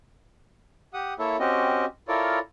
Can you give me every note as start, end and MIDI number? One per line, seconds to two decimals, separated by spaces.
0.94 1.14 67
0.94 1.14 78
0.94 1.14 87
1.19 1.37 58
1.19 1.37 64
1.19 1.37 69
1.19 1.37 73
1.19 1.37 76
1.40 1.85 60
1.40 1.85 61
1.40 1.85 66
1.40 1.85 67
1.40 1.85 75
2.08 2.39 64
2.08 2.39 65
2.08 2.39 69
2.08 2.39 70
2.08 2.39 73
2.08 2.39 74